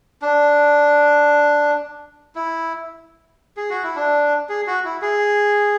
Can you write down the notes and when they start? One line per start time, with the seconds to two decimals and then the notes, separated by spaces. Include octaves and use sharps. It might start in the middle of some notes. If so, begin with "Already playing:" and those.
0.22 D4
2.35 E4
3.57 G#4
3.70 F#4
3.83 E4
3.96 D4
4.49 G#4
4.67 F#4
4.85 E4
5.02 G#4